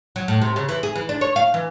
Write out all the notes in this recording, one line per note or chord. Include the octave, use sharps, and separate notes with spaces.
F#3
A2
C3
C#3
E3
G#4
E3
D4
C#5
F5
E3